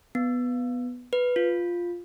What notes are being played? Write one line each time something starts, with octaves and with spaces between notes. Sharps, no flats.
B3
B4
F4